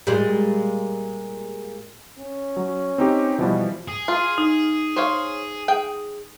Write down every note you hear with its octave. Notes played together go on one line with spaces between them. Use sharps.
A#2 G3 G#3
C#4
F#3
C4 D#4 G4
B2 E3 F3 G3
G#4
F4
D#4
C5 C#5 F5
G#4 G5